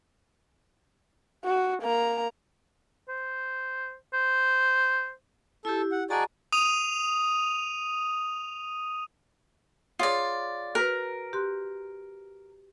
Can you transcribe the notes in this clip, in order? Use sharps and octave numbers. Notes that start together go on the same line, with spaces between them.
F#4
A#3 A#5
C5
C5
E4 G4 A4
F#5
F#4 G#4 D5 D#5 A5 A#5
D#6 D#7 F7
F4 G#4 C#5 D5 D#6
F#4 A#4 B4
G4 C6 F#6